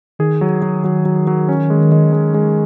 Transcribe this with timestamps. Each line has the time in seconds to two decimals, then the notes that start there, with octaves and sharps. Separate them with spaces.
0.19 D#3 G#4
0.41 F#3
0.62 F#3
0.84 F#3
1.05 F#3
1.27 F#3
1.49 C#4
1.70 G#3
1.92 G#3
2.13 G#3
2.34 G#3